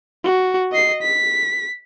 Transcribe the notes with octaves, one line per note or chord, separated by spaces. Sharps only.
F#4
D#5 C7
B6